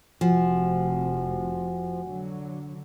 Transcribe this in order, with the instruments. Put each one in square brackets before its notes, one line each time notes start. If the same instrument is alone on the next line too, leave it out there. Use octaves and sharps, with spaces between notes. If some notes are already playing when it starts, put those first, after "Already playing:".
[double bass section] F1 F2 C3 [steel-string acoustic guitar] F3 [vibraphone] F#4 F#5 G#5
[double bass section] D3 F#3